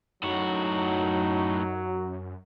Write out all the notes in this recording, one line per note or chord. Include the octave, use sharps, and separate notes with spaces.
F#2 A2 F#3 D#4 F#4